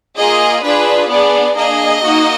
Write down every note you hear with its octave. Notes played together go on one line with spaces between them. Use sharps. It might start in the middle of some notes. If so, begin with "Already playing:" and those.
A#3 F4 G#4 D#5
D4 F4 G#4 B4
B3 D4 G#4 D5
A#3 D4 G#4 D#5
A#3 D#4 F#4